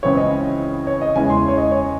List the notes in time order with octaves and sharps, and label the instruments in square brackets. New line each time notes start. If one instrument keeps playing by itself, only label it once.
[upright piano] C#2 C#3 E3 C4 E4 C#5
D#5
C#5
D#5
E2 C#3 G#3 C#4 E4 G#5
C6
C#5
D#5
C#5